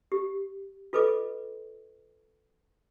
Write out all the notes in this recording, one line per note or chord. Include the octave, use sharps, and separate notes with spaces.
G4
F4 A4 B4 D#5 D6